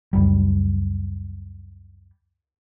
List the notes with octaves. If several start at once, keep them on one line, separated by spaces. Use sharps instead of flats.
C#2 F#2 G3